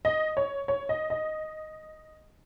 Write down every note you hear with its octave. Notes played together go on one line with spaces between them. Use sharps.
D#5
C#5
C#5
D#5
D#5